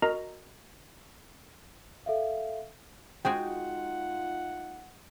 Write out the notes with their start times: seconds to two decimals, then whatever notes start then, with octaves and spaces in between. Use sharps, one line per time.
0.02 F#4 A#4 D#5 A#5
2.06 A4 E5 F5
3.25 G#3 D#4 F4 F#4 G#4 F#5 G5